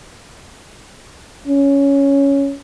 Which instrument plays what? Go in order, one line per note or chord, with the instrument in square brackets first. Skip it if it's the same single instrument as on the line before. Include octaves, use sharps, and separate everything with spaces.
[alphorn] C#4